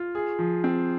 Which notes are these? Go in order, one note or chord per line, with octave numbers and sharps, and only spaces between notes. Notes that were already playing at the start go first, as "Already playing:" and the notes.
Already playing: F4
G#4
F3
C4